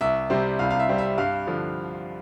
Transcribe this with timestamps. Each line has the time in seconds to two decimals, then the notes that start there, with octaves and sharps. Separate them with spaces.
0.01 C2 E5
0.30 C3 G3 C4
0.59 C2 F5
0.71 F5
0.79 E5
0.88 C3 G3 C4
0.98 E5
1.18 G2 F5
1.47 D3 F3